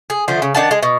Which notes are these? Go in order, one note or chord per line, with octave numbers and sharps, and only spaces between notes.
G#4
D3 F3 A3 C5
C#3
D#3 D4 F#5 A5
G#3
B2